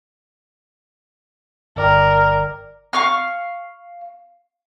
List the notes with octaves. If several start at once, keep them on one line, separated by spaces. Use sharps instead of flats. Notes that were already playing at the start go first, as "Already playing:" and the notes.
G1 A#4 D5 G5
F5 C#6 F6